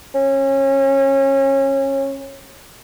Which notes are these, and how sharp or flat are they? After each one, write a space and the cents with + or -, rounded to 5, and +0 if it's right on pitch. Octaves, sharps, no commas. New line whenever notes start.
C#4 -25